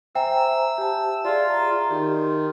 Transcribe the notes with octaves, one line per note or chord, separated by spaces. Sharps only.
C5 E5 G5 G#5 A#5 E6
G4 A5
F4 G#4 D5
A#5
D#3 G4 C6